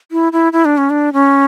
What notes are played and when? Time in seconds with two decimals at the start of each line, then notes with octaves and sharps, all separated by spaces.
0.12 E4
0.32 E4
0.53 E4
0.65 D4
0.78 C#4
0.90 D4
1.13 C#4